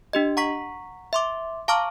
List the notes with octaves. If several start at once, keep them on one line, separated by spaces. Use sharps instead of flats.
D4 G4 D#5
F#5 A#5 C#6 B6
E5 C6 D6
F5 A5 A#5 C#6 D6 F6